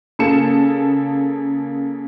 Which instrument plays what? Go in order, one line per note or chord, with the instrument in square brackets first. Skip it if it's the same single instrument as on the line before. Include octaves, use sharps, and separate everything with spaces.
[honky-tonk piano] C#3 A#3 G#4 A4 C#7 E7